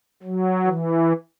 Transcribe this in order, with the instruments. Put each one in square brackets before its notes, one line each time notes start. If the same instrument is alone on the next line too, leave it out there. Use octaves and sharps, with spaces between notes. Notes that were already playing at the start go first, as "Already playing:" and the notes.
[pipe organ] F#3
E3